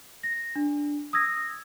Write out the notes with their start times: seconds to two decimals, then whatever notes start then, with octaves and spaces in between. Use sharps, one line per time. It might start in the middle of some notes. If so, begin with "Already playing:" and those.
0.23 A#6
0.56 D4
1.13 D#6 E6 G#6 A#6